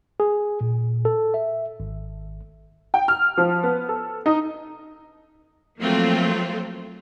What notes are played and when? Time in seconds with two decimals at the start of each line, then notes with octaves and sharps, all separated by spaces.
0.20 G#4
0.61 A#2
1.05 A4
1.34 E5
1.80 G#1
2.94 G5
3.08 F6
3.37 F3
3.63 B3
3.88 A4
4.26 D#4
5.79 F3 F#3 A3 A#3 C4 F4